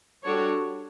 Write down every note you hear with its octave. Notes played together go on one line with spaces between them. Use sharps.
G3 D4 F#4 A4 C#5